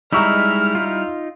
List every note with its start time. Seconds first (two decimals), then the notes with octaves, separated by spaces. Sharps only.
0.13 G3 G#3 D#4 E4 A#5 C#6 E6 F6
0.75 D#4 F4